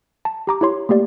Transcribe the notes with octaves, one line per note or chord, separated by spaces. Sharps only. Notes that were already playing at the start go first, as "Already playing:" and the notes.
A5
G4 A#5 D6
E4 G4 C#5 C6
A3 A#3 G4 D5